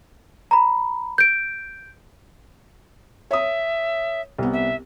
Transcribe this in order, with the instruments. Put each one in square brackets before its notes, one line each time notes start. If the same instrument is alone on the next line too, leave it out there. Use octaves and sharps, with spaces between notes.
[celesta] A#5 B5
G6 D7
[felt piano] C#5 D#6 [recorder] E5
[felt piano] C2 B3
[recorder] E5